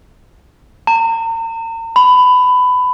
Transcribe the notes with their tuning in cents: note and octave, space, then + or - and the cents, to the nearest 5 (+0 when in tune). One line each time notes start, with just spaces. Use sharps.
A#5 -40
B5 +20